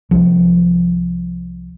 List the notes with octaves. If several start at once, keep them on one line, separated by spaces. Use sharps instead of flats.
C2 F3